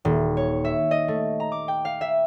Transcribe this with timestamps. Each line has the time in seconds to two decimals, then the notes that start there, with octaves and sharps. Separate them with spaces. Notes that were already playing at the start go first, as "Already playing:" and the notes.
0.05 D#1
0.37 C#5
0.65 E5
0.91 D#5
1.08 A3
1.40 A#5
1.52 D6
1.68 G5
1.85 F5
2.01 E5